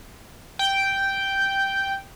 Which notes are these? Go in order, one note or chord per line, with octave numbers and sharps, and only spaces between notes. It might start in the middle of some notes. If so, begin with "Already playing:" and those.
G5